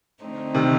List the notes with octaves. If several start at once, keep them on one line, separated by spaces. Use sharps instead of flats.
D3 A3 C4 D#4
C3 D#3